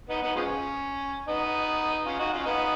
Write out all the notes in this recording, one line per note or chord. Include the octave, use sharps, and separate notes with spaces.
B3 D#4
B3 D#4
F3 G#3 C#4
B3 D#4
C#4 F4
D#4 F#4
C#4 F4
B3 D#4